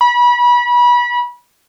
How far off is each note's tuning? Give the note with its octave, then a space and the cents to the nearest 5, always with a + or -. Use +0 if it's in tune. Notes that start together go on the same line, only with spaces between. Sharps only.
B5 -30